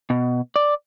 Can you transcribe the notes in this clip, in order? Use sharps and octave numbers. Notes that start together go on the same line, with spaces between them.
B2
D5